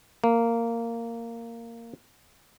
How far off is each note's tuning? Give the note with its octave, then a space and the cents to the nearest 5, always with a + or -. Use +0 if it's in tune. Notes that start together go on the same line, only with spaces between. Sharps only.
A#3 -10